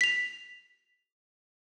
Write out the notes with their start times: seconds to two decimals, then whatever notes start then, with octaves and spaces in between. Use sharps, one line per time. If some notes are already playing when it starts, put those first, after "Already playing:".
0.01 B6 F7